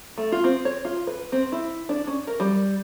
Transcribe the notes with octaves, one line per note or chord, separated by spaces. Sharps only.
A3
F4
C4
C#5
F4
B4
C4
E4
D4
C#4
A#4
G3